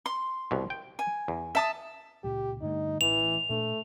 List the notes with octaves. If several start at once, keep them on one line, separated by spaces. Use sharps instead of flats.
C6
C2 B2
G5
G#5
E2
E5 A5 D#6
C#2 A#2 G4
G2 D3 A3 D#4
A1 E3 F7
A#2 A3 D4